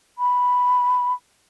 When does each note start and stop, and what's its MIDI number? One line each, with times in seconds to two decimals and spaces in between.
0.18 1.13 83